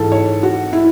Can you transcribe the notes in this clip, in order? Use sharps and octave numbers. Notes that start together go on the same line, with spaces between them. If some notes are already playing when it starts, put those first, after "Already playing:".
Already playing: G#2 E3 A4
C#5
F#4
E4